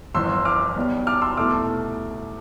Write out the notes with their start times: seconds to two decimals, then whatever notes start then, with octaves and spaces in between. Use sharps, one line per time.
0.15 G1 F2 E3 C6 E6
0.45 D6 F6
0.76 B1 B2 G3
1.07 D6 F6
1.22 C6 E6
1.37 C2 B2 A3 D6 F6